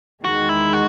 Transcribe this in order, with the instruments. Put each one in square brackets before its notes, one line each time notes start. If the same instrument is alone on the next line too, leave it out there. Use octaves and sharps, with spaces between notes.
[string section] E2 D#3 G#3 [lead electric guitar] F#4
[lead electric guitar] E4
F#4